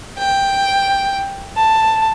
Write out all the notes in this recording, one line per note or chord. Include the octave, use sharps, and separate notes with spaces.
G5
A5